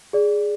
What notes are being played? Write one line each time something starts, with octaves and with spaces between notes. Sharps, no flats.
G#4 D5